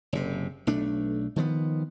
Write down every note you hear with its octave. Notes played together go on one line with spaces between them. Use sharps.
F#1 C3
B1 A3 D4
D#3 F3 G#3 B3